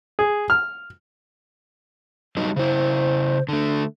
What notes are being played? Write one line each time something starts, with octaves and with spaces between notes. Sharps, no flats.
G#4
F6
F#3 G3 D#4
C#3 E4 C5
D3 A3 D4